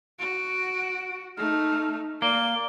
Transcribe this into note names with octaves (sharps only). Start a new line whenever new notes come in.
F#4 D7
A3 D#4 F6
A#3 D5 G7